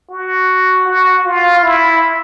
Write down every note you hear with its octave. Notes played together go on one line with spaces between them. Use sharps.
F#4
F#4
F4
E4